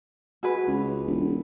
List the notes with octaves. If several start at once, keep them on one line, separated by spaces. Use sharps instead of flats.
F#4 G#4 B4
C#2
E1